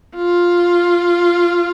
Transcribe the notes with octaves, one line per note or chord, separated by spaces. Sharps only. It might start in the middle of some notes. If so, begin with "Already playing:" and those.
F4